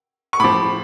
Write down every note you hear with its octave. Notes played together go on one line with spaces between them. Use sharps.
C#6
A2 F3 B5 D6